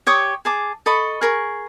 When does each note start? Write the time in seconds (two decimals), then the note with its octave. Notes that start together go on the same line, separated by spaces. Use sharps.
0.07 G4 C#5 C#6 D#6
0.45 G#4 A5 D6
0.86 A4 D#5 B5 C#6
1.21 G#4 A#4 C#6